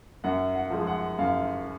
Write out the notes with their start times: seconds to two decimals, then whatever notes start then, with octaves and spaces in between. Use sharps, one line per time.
0.24 F#2 F#5
0.55 F#5
0.70 F3 G#3
0.87 F#5
1.19 F#2 F5